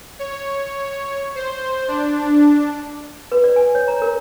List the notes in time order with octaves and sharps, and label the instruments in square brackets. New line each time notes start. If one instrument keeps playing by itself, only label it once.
[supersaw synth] C#5
C5
D4
[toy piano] B4
D5
G#5
C#5
A#5
A#4